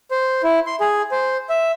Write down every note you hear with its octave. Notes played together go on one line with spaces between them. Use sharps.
C5
E4
C6
G#4
C5
E5